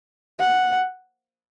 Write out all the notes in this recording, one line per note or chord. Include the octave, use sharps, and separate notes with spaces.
F#5